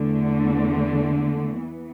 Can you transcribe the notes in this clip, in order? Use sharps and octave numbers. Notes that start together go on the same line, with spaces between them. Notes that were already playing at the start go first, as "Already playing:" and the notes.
Already playing: E2 D3 A3
E3 B3